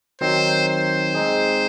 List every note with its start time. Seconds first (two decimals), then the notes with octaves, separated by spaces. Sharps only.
0.21 D#3 F#3 C4 D#4 C5
0.68 C5
1.15 G#3 C4 D#4 G#4